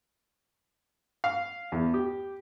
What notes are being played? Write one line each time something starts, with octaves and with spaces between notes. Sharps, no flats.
F5
E2
G4